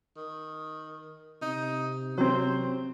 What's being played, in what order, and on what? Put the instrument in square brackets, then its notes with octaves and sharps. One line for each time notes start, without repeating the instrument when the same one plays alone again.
[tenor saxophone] D#3
[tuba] C3 [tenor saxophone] D#4
[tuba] C3 [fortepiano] F#3 C4 [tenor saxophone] C5